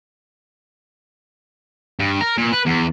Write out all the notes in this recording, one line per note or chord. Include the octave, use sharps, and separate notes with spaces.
G2
A#4
A#2
B4
E2